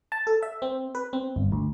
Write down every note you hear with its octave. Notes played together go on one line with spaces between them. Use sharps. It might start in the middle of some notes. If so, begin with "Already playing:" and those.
A5
A4
E5
C4
B4
C4
G1
D2